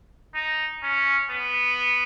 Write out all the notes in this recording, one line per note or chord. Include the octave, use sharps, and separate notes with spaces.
D#4
C#4
B3